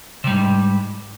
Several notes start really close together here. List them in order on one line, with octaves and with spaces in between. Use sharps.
C3 G3 G#2